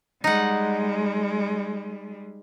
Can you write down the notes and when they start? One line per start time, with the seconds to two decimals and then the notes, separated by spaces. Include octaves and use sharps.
0.24 G3 G#3 D#4 F#5